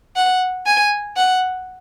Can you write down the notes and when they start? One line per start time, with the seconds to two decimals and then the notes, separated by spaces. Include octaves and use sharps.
0.16 F#5
0.66 G#5
1.16 F#5